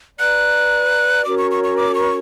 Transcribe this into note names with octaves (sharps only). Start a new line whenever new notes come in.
B4 D5 A#5 F#6
C#4 F#4 A#4 C#5 D6
C#6
C#6
C#6
D6
C#6